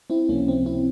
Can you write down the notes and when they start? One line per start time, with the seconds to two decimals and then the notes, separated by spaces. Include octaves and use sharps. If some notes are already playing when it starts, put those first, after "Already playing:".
0.10 C4 E4
0.29 C#2 C3 F3 A#3 C#4
0.48 C4
0.66 C4 E4